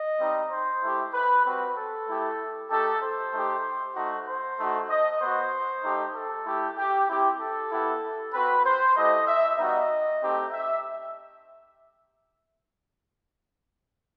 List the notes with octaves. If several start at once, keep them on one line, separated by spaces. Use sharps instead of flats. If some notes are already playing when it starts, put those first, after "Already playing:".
Already playing: D#5
G3 C4 D#4
C5
A3 E4 G4
B4
G3 C4 F#4 B4
A4
A3 E4 G4
A3 D#4 G4 A4
C5
A3 D#4 G4
A3 D#4 F#4
C5
A3 D#4 F#4
D#5
B3 F#4 C5
A3 D#4 G4
A4
A3 E4 G4
G4
C4 E4 G4
A4
B3 E4 G4
C4 F#4 B4
C5
A3 E4 G4 D#5
E5
G3 B3 D#4 F#4 D#5
A3 C4 D#4 G4
E5